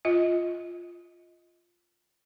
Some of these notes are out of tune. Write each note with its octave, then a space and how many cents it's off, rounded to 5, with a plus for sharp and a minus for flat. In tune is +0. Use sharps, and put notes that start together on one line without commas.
F4 +0 D#5 +20